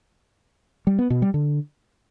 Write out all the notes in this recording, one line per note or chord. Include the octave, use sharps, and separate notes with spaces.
G3
B3
B2
G3
D3